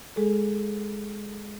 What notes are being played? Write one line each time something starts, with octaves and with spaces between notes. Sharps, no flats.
G#3 G#4 A4